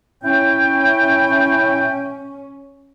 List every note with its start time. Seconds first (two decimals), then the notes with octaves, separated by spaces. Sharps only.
0.24 C#4 E4 G5